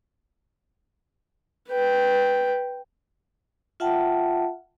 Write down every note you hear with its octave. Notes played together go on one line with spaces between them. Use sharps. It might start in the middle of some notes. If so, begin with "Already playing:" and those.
B4 G5
F4 E5 F#5 G5 A5